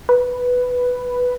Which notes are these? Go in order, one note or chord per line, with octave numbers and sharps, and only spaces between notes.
B4